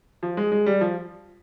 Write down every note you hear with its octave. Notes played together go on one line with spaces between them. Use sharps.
F3
G#3
G#3
G3
F3